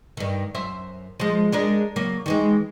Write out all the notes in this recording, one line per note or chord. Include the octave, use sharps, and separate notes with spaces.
G2 D#3
F#2 C5 E5
F3 G#3
G#3 D4 A#4
C#3 F#3 A#3
D#3 E3 G#3